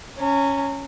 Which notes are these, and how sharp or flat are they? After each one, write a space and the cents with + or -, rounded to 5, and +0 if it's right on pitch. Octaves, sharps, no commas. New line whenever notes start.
C#4 +0 A#5 -30